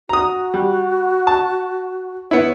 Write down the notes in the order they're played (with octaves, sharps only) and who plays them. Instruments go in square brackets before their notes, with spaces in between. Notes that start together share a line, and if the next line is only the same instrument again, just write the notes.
[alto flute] F#4 [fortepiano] A#5 D#6
[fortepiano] G3
A5
[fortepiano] B3 E4 [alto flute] C#5